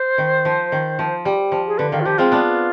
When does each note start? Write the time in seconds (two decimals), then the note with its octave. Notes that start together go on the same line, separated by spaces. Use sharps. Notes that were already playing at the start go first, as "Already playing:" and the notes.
Already playing: C5
0.18 D#3
0.45 F3
0.72 D#3
0.99 F3
1.25 G3
1.52 F3
1.67 G#4
1.78 D3 B4
1.92 D#3 F5
2.01 F4
2.05 F3 G4
2.18 G#3 C4 F4
2.32 B3 D4